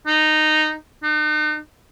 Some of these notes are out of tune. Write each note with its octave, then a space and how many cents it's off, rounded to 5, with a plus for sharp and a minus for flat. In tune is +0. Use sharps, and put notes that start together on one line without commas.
D#4 -10
D#4 -40